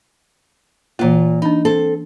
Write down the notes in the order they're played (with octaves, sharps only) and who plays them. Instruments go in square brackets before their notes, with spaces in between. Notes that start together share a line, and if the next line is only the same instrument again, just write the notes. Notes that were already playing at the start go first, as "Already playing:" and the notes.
[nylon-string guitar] A#2 F4 [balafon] E3 A#3
[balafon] D4 B5 [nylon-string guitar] D#4
[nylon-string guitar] C4 A4